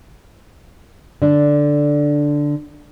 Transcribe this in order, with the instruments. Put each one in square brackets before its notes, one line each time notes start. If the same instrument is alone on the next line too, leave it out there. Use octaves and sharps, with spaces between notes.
[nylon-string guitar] D3 D4